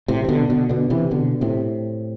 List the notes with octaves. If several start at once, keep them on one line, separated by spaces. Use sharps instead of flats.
A2 C3
E3
B2 D3
B2 D3
B2 D3
C3 E3
B2 D3
A2 C3